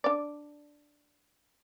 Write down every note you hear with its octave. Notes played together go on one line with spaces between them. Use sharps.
D4 D5